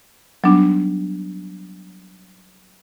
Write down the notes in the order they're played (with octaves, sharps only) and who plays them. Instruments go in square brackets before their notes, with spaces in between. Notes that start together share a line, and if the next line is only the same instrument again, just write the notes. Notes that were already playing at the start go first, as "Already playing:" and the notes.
[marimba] F#3 G3 B3 D4 D#4